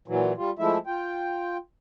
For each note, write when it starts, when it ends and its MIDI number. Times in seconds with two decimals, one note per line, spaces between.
0.08 0.33 46
0.08 0.33 52
0.08 0.33 54
0.37 0.51 55
0.37 0.51 65
0.59 0.78 53
0.59 0.78 56
0.59 0.78 57
0.59 0.78 64
0.59 0.78 76
0.87 1.57 65
0.87 1.57 79